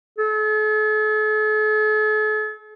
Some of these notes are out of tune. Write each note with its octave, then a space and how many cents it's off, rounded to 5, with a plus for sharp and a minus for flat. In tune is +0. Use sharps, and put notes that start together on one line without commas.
A4 -45